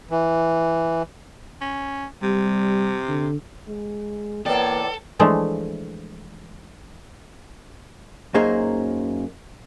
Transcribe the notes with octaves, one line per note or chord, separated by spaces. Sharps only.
E3
C#4
C3 G3
D3
G#3
E2 A#3 A4 B4 C#5 D5 G5
E3 F3 G#3 A3 D4
F#2 F#3 A#3 D#4 G#4 C5